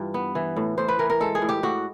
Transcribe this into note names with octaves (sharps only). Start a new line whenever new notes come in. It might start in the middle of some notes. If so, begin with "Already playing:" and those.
Already playing: G2 E3 F4
B3
E3
A2
A2 C5
B4
E3 A#4
A#4
G#3 A4
G#4
A2
G4
A2 F#4